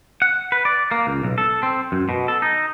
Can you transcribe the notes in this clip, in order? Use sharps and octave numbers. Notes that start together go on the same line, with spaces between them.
F#5
B4
D5
A#3
C#2
B1
A4
C4
F#2
B2
A4
D#4